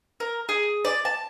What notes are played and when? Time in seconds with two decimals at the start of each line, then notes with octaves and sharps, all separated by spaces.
0.20 A#4
0.49 G#4
0.85 D5
1.05 A5